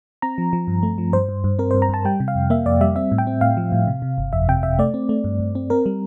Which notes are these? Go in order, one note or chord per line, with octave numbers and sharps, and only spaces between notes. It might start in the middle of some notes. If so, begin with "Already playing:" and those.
C4 A#5
F3
F3
G2
A3
F3
G2 C5
G2
G2
C4 A#4
C5
G2
A#5
G2 A5
G3 G5
C3
F5
F2
A#3 E5
F2 D5
G3 E5
C4 E5
A2
G5
C4
A2 F5
F3
A2
C3
C3
G1
F2 E5
C3 G5
C3 E5
A3 D5
C4
A3
G2
G2
C4
C4 A#4
G3